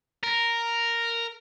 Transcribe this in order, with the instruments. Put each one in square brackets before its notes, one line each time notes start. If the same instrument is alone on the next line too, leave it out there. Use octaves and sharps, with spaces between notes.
[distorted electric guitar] A#4